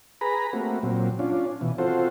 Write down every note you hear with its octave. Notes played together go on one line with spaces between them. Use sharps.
G#4 B4 A#5 B5
A3 A#3 C4 F#4
A#2 F#3 C4
C#4 D4 F4
B2 E3
C4 F4 F#4 A4 C5